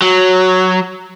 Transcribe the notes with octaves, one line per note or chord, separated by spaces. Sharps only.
F#3